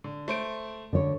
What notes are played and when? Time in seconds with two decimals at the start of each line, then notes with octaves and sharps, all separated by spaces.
0.04 D3
0.28 A3 C5 D7
0.93 D3 C#5